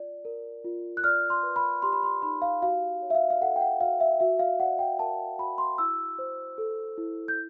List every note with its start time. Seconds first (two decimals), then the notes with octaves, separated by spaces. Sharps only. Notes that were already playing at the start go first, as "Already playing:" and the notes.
Already playing: F4 D5
0.25 A#4
0.64 F4
0.97 F#6
1.04 D5 F6
1.30 C6
1.43 B4
1.56 B5
1.82 G4 C6
1.93 B5
2.03 C6
2.22 D#4 B5
2.42 F5
2.62 F#4 F5
3.02 C#5
3.10 E5
3.15 F5
3.30 F5
3.41 A4 F#5
3.56 G5
3.61 F#5
3.80 F#4 F5
4.00 E5
4.20 F#4 E5
4.39 F5
4.59 D5 F#5
4.79 G5
4.99 A#4 A5
5.39 F#4 B5
5.58 C6
5.78 E4 E6
6.19 C5
6.58 A4
6.98 E4
7.28 G6